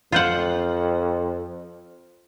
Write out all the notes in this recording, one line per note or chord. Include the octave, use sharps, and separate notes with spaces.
F2 F4 C5 F#5